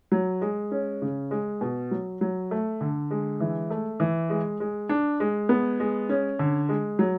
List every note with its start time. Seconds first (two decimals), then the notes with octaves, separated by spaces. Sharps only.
0.12 F#3
0.42 G#3
0.72 C#4
1.02 C#3
1.31 G#3
1.61 B2
1.91 F#3
2.21 F#3
2.51 A3
2.81 D3
3.11 G#3
3.40 E3
3.70 A3
4.00 E3
4.30 G#3
4.60 G#3
4.89 D4
5.20 G#3
5.49 B3
5.80 G#3
6.09 C#4
6.39 D3
6.69 G#3
6.99 F#3